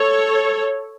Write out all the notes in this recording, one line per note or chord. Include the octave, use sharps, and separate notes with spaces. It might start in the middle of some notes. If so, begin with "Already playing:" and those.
Already playing: A4 C#5